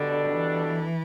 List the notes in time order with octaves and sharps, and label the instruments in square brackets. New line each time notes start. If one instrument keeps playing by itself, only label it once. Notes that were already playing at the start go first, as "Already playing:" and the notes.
Already playing: [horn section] B2 G3 D4 A4 [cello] D3
[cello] E3